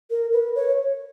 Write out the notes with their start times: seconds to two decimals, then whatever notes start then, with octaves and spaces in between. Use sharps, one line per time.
0.10 A#4
0.33 B4
0.55 C#5